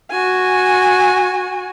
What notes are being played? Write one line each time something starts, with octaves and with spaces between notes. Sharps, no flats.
F#4 G#5